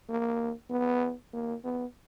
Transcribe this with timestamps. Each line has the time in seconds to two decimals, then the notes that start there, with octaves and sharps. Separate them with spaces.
0.09 A#3
0.70 B3
1.33 A#3
1.64 B3